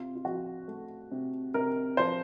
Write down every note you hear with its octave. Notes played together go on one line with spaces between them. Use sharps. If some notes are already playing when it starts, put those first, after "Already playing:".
Already playing: C3 F4
F4
F3 F#4
A3
C3
C3 A#4
F3 C5